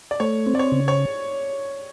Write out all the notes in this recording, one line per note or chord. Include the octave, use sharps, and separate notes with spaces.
D5
A3 C#5
C4
D5
C#5
C#3
C#5